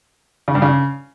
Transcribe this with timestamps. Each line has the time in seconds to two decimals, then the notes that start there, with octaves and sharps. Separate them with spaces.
0.48 C#3
0.55 G2
0.62 C#3